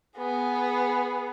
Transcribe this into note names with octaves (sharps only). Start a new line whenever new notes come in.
B3 G#4